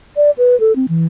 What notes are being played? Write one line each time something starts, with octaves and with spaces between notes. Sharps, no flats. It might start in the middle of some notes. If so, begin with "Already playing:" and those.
D5
B4
A4
C4
E3